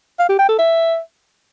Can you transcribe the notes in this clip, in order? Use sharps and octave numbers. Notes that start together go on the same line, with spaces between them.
F5
G4
G5
A4
E5